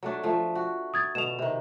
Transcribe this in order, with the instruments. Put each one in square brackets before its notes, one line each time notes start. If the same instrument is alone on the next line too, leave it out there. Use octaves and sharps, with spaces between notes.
[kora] F#3 A3 D4
F3 A3
F#4
[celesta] D#6 G#6 A6
[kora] B2 D3 [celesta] E7 F7
[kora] C3 D#3